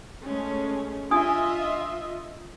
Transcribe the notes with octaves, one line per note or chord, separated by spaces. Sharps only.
G#3 A3 C#4
D4 F4 D#5 E5 G#5 D#6